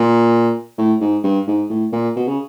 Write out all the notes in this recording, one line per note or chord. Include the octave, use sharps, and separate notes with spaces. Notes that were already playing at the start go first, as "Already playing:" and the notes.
Already playing: A#2
A2
G#2
G2
G#2
A2
A#2
B2
C#3